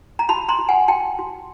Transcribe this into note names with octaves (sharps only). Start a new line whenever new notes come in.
A#5
F#4 A5 B5
A#5 C6
F#4
F#5 G#5
F#4 G5 A5
F#4